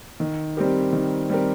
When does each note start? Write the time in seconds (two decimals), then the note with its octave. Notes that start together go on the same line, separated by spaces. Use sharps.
0.20 D#3
0.57 G3 C4 G4 A#4
0.92 D#3
1.29 G3 C4 G4 A#4